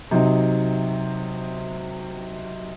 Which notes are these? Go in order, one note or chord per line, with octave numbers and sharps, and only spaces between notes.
C3 F#3 D#4